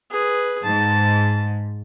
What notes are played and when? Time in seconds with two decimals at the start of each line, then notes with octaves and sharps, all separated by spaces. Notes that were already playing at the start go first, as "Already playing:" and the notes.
0.11 G#4 B4
0.64 G#2 A5